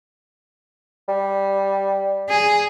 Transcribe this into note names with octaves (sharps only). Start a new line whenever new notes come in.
G3
G#4